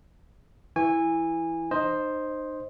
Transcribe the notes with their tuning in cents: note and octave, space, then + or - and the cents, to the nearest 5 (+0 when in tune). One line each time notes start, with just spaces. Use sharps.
E3 +0 G#5 -20 C#6 +0
D#4 -35 C5 +5 D#5 +0